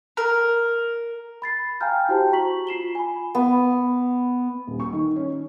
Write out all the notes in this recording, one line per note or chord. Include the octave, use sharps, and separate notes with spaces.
A#4
B5 A6 C7
F5 G5 G#5 A#5 F6 G6
E4 F#4 G4 C5 G5 A5
F#4 A#5 C#6 B6 F#7
F4 C7 E7 G7
G#5 B5
B3
D#1
C#6
D#3
C#4
D#4